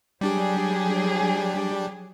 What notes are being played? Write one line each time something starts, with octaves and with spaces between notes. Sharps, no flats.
F#3 G3 D4 G4 G#4